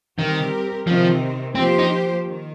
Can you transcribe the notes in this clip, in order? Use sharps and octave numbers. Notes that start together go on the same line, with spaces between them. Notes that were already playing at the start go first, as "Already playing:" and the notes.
D#3 G3 C4 G4 A#4
C3 D#3 F3 C4
F3 A#3 C4 G4 C5
D#4
D#3